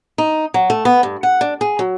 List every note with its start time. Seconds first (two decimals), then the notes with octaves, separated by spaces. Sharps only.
0.18 D#4
0.54 F#3
0.70 A3
0.85 B3
1.03 G2
1.23 F#5
1.41 D4
1.61 G#4
1.79 F#3